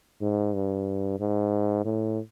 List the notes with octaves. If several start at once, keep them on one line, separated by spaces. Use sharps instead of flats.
G#2
G2
G#2
A2